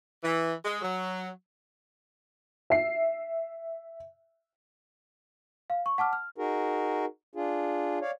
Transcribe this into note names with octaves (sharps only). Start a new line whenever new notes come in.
E3
G#3
F#3
E5 C7
F5
C#6
F#5 A5 D6 F6
F6
D#4 F#4 G#4 A#4
D4 F4 G#4
C#5 D5 F5